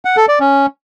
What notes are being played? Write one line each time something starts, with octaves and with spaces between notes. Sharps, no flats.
F#5
A4
D5
C#4